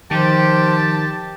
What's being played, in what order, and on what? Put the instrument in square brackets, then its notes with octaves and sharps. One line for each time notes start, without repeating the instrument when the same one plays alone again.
[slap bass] D#3 [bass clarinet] F3 [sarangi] G4 [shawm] A5